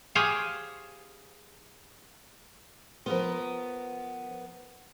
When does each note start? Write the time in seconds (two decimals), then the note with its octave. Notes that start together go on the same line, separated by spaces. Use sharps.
0.15 G4 G#4 C5 C#5 F5
3.06 F3 B3 F4 A#4